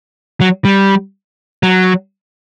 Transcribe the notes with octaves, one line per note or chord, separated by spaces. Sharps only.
F#3
G3
F#3